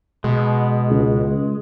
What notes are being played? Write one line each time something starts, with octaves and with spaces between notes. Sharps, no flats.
B2 G#3
C#2